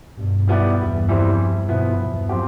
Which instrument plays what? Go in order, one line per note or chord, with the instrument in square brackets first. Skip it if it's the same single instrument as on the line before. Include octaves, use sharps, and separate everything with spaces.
[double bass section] G2 B2
[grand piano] G3 B3 E4 G4 D5
[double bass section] E2 G2
[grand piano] F2 E3 G3 C4
[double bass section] G2 B2 [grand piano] F3 B3 E4
[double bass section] E2 G2
[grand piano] F3 C4 G4